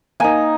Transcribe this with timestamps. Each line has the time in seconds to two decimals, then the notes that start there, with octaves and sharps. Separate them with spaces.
0.20 A#3 D#4 G#5